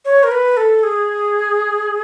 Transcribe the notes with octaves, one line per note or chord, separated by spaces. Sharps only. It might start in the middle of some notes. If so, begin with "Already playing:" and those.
C#5
A#4
B4
A4
G#4